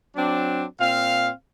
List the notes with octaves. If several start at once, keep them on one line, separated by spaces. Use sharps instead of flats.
F#3 C4 D4
A#2 C4 F5